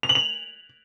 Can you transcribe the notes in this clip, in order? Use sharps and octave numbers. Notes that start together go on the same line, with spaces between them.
F7
F#7
F7